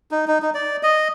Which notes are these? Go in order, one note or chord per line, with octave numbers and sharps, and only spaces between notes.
D#4
D#4
D#4
D5
D#5